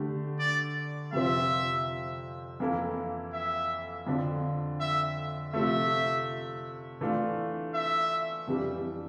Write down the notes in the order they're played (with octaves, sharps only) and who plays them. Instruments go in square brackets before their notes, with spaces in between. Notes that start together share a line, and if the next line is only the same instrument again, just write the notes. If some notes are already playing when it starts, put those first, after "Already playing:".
Already playing: [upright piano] D3 A3 D4 G4
[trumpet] D5
[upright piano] F2 C3 F3 C4 [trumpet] E5
[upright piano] F2 E3 A#3 E4 A4
[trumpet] E5
[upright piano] F2 D3 F3
[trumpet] E5
[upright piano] C3 F3 A3 [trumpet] E5
[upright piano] E3 A3 D4 F4
[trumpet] E5
[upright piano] F2 E3 G3 D4